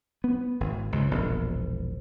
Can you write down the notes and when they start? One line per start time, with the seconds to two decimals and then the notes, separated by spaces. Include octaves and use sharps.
0.24 B3
0.60 G#1
0.92 C#2 C#3
1.10 E1 A#1 B2